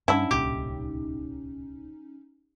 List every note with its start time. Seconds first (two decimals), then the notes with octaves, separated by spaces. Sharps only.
0.08 G2 D3 G3 C#4 D#4 E4 A4 G#5
0.31 D1 C2 A#2 G4